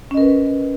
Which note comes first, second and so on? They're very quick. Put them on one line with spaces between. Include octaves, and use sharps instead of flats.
C#4 D#5 A#4 B4